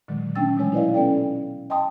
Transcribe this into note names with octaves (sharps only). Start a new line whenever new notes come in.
A#2 D3 D#3 F#3 G#3
A3 C#4 D4 G5 E6 A6
B2 E3 F#3 G#3 C#5 G#5
D#4 E4 B4 D5 D#5 F5
B3 C#4 A4 D5 G5
D#5 G5 A5 C6 D#6